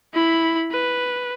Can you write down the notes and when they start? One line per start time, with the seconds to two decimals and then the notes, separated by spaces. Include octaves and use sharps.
0.14 E4 B5
0.72 B4